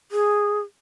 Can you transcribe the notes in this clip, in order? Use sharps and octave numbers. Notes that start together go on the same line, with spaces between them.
G#4